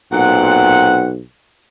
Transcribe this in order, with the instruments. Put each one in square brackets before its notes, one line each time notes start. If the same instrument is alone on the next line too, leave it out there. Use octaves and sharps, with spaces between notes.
[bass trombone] B1 [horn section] A#2 C4 F#5